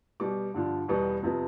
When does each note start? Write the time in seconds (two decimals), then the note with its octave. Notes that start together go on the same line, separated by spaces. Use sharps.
0.20 B2 G3 B3 D6
0.54 G2 D3 F3
0.88 E2 B2 G3 B3
1.23 F2 C3 F3 B3